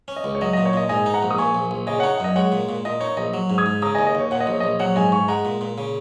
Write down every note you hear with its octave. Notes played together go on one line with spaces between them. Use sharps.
C#4
D#5
C#2
C#5
F#3 D#5
D#5
A#2
C#5
A#2 D#5
G#2 D#5 G#5
D#4
F#5 A#5
A#1
D#6
A#2 G#5 C#6
A#1
A#1
C#3 D#5 G#5
D#4 C#5 F#5
F#5
F#2 D#5
G#3 C#5 F#5
A#2
A#2
A#2 D#5
D#4 C#5
A#1 D#5
F#3
G#2
D#6 G#6
G#2
C#3 A#5 D#6
D#5 G#5
D#2
D#5
D#2 C#5
A#2 F#5
D#5
A#1 C#5
A#1 D#5
F#3 C#5 F#5
G#2 D#5 G#5
G#2 G#5 C#6
G#3 F#5 A#5
A#2
A#2
C#3